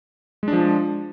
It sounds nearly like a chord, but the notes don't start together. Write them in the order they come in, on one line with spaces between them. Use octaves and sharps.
G#3 D4 F3